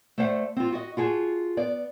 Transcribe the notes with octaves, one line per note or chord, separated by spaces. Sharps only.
A3 C5 D5 F5 F#5
C4 F4
F#4 D#5
F4 F#4 G#4 A5
B3 D5